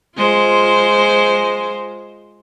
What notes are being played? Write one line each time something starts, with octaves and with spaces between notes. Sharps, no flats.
G#3 F4 C5